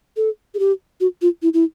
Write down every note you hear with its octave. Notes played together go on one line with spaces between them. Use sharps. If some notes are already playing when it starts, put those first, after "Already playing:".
A4
G#4
G4
F#4
F4
E4
E4